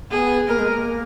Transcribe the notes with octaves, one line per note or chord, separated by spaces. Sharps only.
B3 G#4
A#3 A#4
G#3
A#3